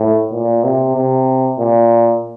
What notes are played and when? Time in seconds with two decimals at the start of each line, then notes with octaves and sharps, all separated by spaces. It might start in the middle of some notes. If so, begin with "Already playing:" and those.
Already playing: A2
0.33 A#2
0.64 C3
0.96 C3
1.59 A#2